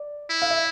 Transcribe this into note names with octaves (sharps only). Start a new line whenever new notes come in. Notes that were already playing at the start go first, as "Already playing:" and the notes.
Already playing: D5
E4
F5
E5